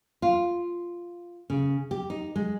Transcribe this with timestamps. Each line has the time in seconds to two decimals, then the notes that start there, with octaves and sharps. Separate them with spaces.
0.22 F4
1.50 C#3
1.91 G4
2.10 D#4
2.36 G#3